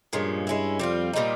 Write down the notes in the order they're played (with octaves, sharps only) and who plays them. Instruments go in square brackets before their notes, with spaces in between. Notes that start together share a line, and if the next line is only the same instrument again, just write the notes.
[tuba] G2 [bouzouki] A#2 F3 G#3 C#4
[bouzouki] G#3 C#4 E4
[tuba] F2 [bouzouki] G3 C4 F4
[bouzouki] A#2 G3 C4 D#4